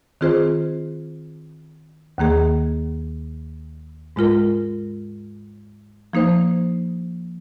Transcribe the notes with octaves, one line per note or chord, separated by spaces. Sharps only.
D#3 C4 F4 G#4 C5
D#2 D#3 A#3 G#4
G#2 G#3 F4 A#4
F3 A#3 D#4 C5